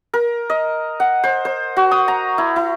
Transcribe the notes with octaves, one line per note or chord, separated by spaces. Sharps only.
A#4
D#5
F#5
C5
C5
F#4
D#6
A#5
E4
E4